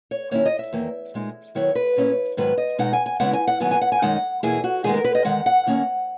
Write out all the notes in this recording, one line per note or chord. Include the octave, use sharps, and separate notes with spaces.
C#5
D#3 A#3 C#4 E4 C#5
D#5
E5
E2 D#3 A#3
A#2 G#3 D#4
D#3 F#3 B3 E4 C#5
B4
A#2 A#3 C#4 E4
G#2 D#3 F#3 B3 B4
D#5
B2 G#3 D#4 F#5
G#5
G#5
C#3 G#3 B3 E4 F#5
G#5
F#5
D#3 F#3 B3 G#5
G#5
F#5
G#5
F#2 D#3 G#3 D#4 F#5
E2 B2 A#3 E4 G#4
F#4
D#3 G#3 B3 G#4
A#4
B4
D#5
E2 D#3 G#3 F#5
F#5
D#3 A#3 C#4